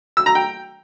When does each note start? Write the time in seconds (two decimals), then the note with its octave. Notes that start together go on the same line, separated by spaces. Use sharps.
0.17 E6
0.26 A#5
0.35 G5